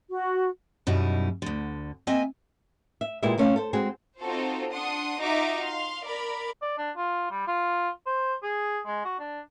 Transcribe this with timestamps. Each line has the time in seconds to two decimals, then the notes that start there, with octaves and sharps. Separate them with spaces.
0.11 F#4
0.87 F#2 B2 G3 D#4 E4
1.42 D2 D3
2.07 A#3 C4 D#5 E5 G#5
3.01 E5
3.23 A#2 G#3 B3 E4 G4 E5
3.38 C3 A3 C#4 A4 F5
3.56 A4 C5
3.73 G#3 C4 F#4 G#4
4.20 C4 D#4 F4 F#4 A4 C5
4.71 D4 F#5 C6 D#6
5.20 D#4 F4 F#4 D#5 E5 D6
5.63 F5 C6
6.03 A#4 D5 B5
6.62 D5
6.78 D4
6.96 F4
7.31 G3
7.47 F4
8.06 C5
8.43 G#4
8.86 G#3
9.05 F#4
9.19 D4